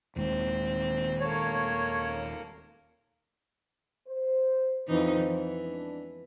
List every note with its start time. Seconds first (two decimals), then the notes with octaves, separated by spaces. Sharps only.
0.16 D#1 D#2 G#3 C4
1.20 A#3 A4 C#5
4.07 C5
4.87 F2 E3 D#4 C5
5.20 E3
5.61 G#3 B3 D4